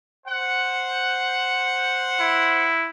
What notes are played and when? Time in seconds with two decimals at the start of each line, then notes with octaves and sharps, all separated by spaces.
0.26 C5 F#5
2.20 E4